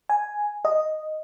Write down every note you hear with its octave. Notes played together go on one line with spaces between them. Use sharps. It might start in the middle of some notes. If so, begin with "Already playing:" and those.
G#5
D#5